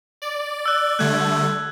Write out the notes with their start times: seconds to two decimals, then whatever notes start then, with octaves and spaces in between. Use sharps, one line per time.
0.22 D5
0.66 E6 F#6
0.99 D3 G3 A3 F#6 G#6